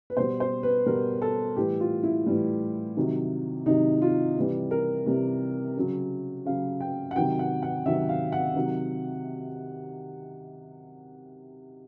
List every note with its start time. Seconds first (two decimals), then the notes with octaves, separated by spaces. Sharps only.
0.10 B4
0.17 B2 G3 C5
0.40 C5
0.63 B4
0.86 B2 G3 A#4
1.22 A4
1.56 A2 E3 G3 G4
1.80 F4
2.03 E4
2.27 A2 E3 G3
2.97 C3 D#3 F#3
3.66 C3 D#3 F#3 D#4
4.02 F4
4.36 C3 E3 G3
4.71 A#4
5.06 C3 E3 G3
5.77 C#3 F#3
6.45 C#3 F#3 F5
6.81 G5
7.11 F#5
7.16 C3 D#3 F#3 G5
7.39 F#5
7.62 F#5
7.85 C3 D#3 F#3 E5
8.09 F5
8.32 F#5
8.56 C3 D#3 F#3